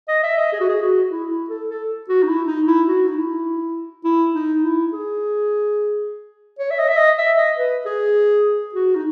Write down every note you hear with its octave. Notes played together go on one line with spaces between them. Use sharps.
D#5
E5
D#5
G#4
F#4
G#4
F#4
E4
E4
A4
A4
F#4
D#4
E4
D#4
E4
F#4
D#4
E4
E4
D#4
E4
G#4
C#5
E5
D#5
E5
D#5
E5
D#5
B4
G#4
F#4
D#4